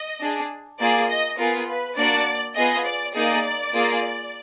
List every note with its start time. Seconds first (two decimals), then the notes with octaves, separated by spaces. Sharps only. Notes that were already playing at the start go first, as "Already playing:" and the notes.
Already playing: D#5
0.21 D4 G#4
0.80 A#3 F4 G#4 D5
1.10 D#5
1.38 B3 F4 G#4 A#4
1.68 B4
1.97 A#3 D4 F#4 D5
2.56 B3 F4 G#4 D#5
2.85 D5
3.15 A#3 D#4 G#4 D5
3.74 A#3 F4 G#4